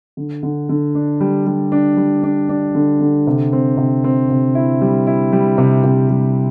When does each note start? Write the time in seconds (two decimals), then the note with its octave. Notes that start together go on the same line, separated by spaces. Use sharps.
0.17 D3
0.43 D3
0.69 D3
0.95 D4
1.20 G3
1.47 G3
1.72 D4
1.97 G3
2.23 D4
2.49 D4
2.75 D3
3.01 D3
3.27 C3
3.53 C4
3.77 C3
4.04 C4
4.30 C3
4.55 E4
4.81 G3
5.07 E4
5.33 G3
5.58 C3
5.84 C3
6.09 G3